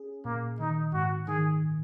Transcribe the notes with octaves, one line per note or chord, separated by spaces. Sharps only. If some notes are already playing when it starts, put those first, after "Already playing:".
Already playing: C#4 G#4
A#2 A#3
D#3 D#4
G#2 F#4
D#3 G#4